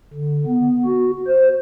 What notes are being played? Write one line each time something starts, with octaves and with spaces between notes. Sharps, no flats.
D3
B3
F#4
C5